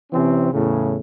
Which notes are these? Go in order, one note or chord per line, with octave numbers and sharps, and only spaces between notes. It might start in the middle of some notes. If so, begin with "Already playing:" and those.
C3 E3 C4 C#4
E2 A2 C#3